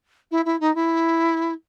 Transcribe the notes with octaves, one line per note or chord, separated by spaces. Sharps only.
E4
E4
D#4
E4